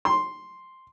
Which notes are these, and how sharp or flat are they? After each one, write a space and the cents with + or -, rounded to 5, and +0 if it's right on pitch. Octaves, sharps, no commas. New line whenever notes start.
C6 +0